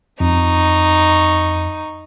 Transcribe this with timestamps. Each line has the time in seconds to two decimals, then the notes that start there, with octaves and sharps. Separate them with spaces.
0.20 F2 D#4 C#6